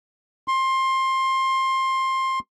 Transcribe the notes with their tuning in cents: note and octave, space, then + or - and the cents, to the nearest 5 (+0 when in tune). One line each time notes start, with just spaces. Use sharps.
C6 +20